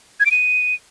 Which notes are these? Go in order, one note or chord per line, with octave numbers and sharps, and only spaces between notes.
G#6
D7
D#7